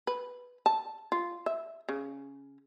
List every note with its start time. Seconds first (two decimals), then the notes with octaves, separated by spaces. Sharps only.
0.07 B4
0.66 A5
1.12 F4
1.46 E5
1.89 C#3